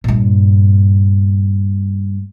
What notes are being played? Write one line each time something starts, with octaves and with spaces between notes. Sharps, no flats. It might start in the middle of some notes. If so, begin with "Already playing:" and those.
G2 A#2